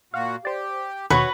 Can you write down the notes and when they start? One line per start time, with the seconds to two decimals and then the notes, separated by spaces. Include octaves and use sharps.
0.14 A#2 F#4 F5
0.45 G4 C5 D5
1.10 D#2 B2 F#4 B4 C#5